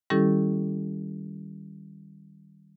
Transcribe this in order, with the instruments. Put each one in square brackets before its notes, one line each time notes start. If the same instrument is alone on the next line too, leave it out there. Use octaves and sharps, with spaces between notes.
[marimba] D#3 G3 C#4 E4 G4 A4